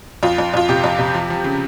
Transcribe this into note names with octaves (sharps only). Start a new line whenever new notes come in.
F2 F4
F2
F2 F4
C3 G4
F2
C3
F3
F3
C#3